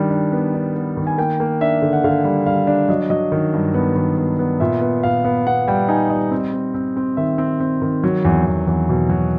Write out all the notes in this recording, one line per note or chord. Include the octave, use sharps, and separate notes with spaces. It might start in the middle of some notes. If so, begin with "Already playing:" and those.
Already playing: D#3 G3 D4
D4
B3
D4
B3
D#3
G#5
A#3 G5
A#3
D4 E5
D3
F#5
D3 F5
G3
G3 F5
D4
F#3 D#5
D5
F#3 D#5
D#3
G2
B3
D#3
B3
B3
A#2 E5
B3
A#2 F5
B3
B3 F#5
G3 G5
D#4 G#5
G3 D#5
C4
C4
C4
C4
D#3 E5
C4
C4
D#3
F#3
E2
E2
E2
B2
F#3